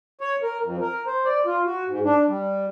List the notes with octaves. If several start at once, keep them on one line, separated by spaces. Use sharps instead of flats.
C#5
A#4
F2
A#4
C5
D5
F4
F#4
G#2
D4
G3